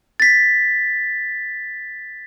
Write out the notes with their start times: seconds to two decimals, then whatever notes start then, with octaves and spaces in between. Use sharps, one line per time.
0.20 A6 B6